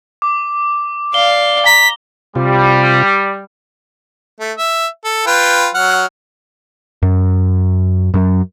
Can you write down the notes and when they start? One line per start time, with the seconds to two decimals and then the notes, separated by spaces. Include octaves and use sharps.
0.22 D6
1.14 D5 F5 G7
1.66 A#5 B6
2.35 C3 G3 F4
4.40 A3
4.58 E5
5.04 A4
5.26 F4 B4 G5
5.75 F#3 F#5 F6
7.02 F#2
8.14 F#2